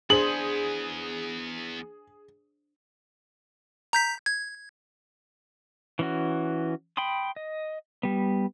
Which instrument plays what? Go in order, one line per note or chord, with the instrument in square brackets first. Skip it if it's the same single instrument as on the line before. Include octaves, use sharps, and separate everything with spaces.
[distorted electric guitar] E2 B3 [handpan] D4 C5 [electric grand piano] G#4 [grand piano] F#7
[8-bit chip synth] A#5 G6 B6
G#6
[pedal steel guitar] E3 C#4 F#4
G5 B5 C6 D#6
D#5
G3 B3